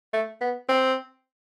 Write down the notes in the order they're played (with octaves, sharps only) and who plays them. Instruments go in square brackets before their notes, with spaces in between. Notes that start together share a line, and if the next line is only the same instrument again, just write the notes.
[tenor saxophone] A3
B3
C4